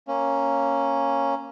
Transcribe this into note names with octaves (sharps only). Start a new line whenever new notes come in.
A#3 C#4